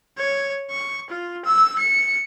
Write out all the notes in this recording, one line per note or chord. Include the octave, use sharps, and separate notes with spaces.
C#5
C#6
F4
E6
C#7